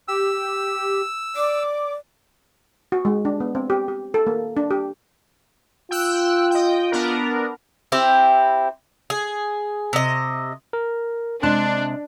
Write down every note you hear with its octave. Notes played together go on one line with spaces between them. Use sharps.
G4 E6
D5 D6
F#4
G#3
D4
B3
C4
G4
G4
A4
A#3
D4
G4
F4 G5 E6 F#6
D#5 G5
B3 D4 A#4
C4 E4 G4 C5
G#4
C3 D#5
A#4
C3 G#3 D4 A5 F#6